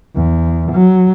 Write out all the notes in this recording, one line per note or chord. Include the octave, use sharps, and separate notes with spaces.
E2
F#3